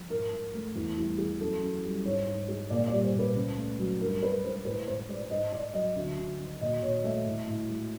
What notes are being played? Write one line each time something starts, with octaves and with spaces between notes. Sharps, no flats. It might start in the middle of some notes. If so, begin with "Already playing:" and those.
Already playing: F3
G#2 A#4
G#2
A3
E2 E4
G3 E4
E3 G#4
F#2 A4
F#2
G3
G#2 C#5
G#2
G#3
A#2 D5
G3 D5
C5
A#2 B4
C#2
A3
F#3
G2 A#4
G2 B4
G#3 C5
A2 B4
A2 C5
G#3 D5
G#2 D#5
G#2 D5
F#3 D#5
D2 E5
D2
D#3
A#2 D#5
A#2 C#5
A3 E5
A2
A2
G#3